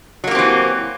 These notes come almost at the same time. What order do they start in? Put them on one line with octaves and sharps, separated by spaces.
F#3 A#3 G4 C4 E3